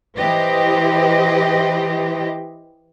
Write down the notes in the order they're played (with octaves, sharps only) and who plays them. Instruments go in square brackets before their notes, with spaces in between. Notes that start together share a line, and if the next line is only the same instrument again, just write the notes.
[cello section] E3 E4 G4 B4 C5 D#5